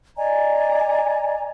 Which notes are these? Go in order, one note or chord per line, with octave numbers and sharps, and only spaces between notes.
D5 D#5 G#5 A#5